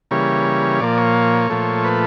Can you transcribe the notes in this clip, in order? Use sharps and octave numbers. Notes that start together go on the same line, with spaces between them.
C#3 E3 G3 A#3 C#5
A#2 F3 A#3 D5
C#5
A#2 F3 A3
B4